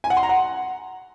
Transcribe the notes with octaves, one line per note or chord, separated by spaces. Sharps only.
G#5
F#5
C6
A#5
F#5